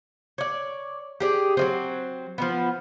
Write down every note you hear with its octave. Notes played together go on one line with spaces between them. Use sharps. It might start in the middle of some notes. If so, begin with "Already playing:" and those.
C#5 D5
G4 G#4 D5
F#3 G#3 C4
F3 G3 B3